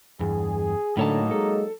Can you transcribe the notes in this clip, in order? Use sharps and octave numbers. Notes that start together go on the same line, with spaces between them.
E2 G2 G#4
A2 D3 F#3 A#3 D#4 C#5 A5
G#3 A4